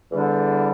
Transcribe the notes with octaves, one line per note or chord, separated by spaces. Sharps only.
E2 D3 G3 D4